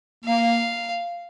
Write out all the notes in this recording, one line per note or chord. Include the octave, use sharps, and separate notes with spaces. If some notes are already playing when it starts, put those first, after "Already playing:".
A#3 F5